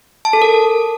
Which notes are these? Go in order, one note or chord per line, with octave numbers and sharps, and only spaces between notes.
A5
A4
A#4